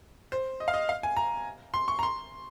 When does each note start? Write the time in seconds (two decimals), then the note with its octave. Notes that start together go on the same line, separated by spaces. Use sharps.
0.32 C5
0.60 D#5
0.68 F5
0.74 D#5
0.89 F5
1.03 G#5
1.17 A#5
1.74 C6
1.88 C#6
1.99 A#5
2.03 C6